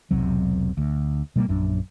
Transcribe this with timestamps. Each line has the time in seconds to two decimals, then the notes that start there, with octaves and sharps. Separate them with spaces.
0.11 E1 B1 C3 F#3
0.77 D2
1.36 B2 G3 A3 A#3
1.48 A#1 F#2 D#3 D4